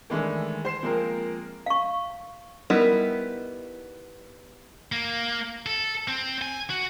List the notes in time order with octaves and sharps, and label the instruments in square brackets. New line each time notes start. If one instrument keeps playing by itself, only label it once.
[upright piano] D#3 E3 G#3 A3 D4
C5 C7 E7
F3 G#3 A#3 C4 A#4
[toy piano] F5 C#6
[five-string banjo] G3 B3 D#4 E4 A#4
[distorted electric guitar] A#3
A4
C4
G#5
F#4